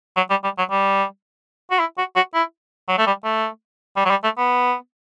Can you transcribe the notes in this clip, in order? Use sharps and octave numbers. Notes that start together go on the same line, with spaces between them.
F#3
G3
G3
F#3
G3
F#4
E4
F#4
F#4
E4
F#3
A3
G3
A3
G3
F#3
G3
A3
B3